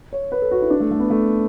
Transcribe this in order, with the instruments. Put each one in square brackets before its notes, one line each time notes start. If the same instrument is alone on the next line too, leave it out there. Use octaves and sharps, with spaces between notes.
[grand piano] C#5
B4
A4
F#4
E4
D4
A3
A3
B3
A3